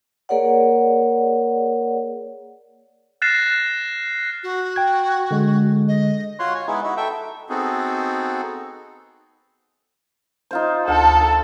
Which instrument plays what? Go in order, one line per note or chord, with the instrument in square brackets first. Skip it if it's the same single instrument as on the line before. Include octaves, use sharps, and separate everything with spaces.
[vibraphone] A#3 G#4 A#4 C#5 D5 F#5
[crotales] F6 F#6 A6 A#6 C7 E7
[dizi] F#4
[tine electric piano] G5 G#6
D3 G#3
[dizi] D#5
[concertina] F4 F#4 C#5 F#5 C6
C#5 G#5
G#3 B3 D#4 E4
D#4 E4 F#4
A4 E5 G5
[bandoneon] B3 C4 D#4 F#4 G#4 A4
[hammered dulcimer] D#4 F4 C5
[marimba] D2 [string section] A4